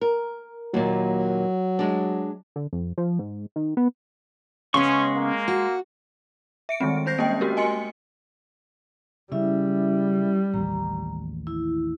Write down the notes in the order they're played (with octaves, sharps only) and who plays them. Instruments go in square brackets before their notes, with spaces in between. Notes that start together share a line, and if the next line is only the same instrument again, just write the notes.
[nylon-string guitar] A#4
[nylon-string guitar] D#2 A#2 [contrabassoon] F#3
[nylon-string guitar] G#3 D4
[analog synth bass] D3
F2
F3
G#2
D#3
B3
[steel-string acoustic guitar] C#3 B3 [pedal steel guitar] G#3 C6 C#6 [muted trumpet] C#4
[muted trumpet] A#3
[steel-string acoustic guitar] F#4
[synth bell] E5 C#7 D7
D#3 G3 G#3 C4
C4 C5 G6 A#6 C7
G#3 A#3 C4 C#4 D#5 G5
A3 F#4 G4 A#4
D#5 G#5 C6 C#7
[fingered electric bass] C#3 [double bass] G3 [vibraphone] C#4 E4 E5
[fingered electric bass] A1 D#2 [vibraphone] A#5
[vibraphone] E4